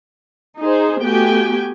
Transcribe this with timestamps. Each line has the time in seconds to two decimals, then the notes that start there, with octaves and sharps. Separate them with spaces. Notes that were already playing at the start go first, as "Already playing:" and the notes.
0.60 D#4 G#4 C5
1.01 A3 B3 F#4 G4 G5 G#5